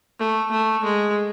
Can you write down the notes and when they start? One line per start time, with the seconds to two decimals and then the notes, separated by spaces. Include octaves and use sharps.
0.20 A3
0.51 A3
0.84 G#3